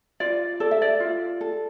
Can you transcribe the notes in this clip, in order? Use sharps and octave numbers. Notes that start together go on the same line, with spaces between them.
F4 D5
A4 D5
E5
D5
F4
A4